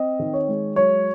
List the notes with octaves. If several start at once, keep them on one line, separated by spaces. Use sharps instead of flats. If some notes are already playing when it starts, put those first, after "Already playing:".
Already playing: C4 D#5
D#3
C#5
G#3
F#3 C#5